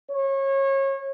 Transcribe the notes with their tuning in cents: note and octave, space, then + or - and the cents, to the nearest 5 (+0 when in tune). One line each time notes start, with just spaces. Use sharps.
C#5 -30